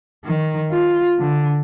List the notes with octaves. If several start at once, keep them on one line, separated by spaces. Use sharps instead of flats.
D#3
F4
D3